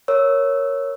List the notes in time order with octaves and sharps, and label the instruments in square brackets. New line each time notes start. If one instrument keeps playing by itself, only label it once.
[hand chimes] A#4 C#5 E6